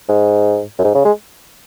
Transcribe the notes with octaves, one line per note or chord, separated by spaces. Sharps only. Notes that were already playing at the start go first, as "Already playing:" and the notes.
G#2
F#2
G#2
C#3
G#3